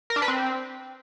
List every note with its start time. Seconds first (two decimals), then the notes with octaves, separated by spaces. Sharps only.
0.10 A#4
0.16 D4
0.22 B4
0.28 C4